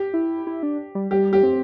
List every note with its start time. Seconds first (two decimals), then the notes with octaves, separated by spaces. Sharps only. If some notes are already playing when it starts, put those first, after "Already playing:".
Already playing: G4
0.14 E4
0.47 E4
0.63 D4
0.95 G3
1.11 G3 G4
1.33 G4
1.43 C4